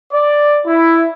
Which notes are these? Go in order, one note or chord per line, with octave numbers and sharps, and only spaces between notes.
D5
E4